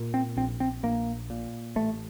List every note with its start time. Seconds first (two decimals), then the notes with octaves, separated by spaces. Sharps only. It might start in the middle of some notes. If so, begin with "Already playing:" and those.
Already playing: A#2
0.14 C4
0.37 A#1 C4
0.60 C4
0.83 A#1 A#3
1.30 A#2
1.76 A1 A3